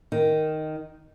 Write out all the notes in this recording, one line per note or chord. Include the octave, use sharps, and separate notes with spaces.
D#3